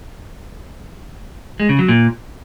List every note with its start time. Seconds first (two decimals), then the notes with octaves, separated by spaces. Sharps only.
1.60 G#3
1.69 C#3
1.79 F#3
1.89 A#2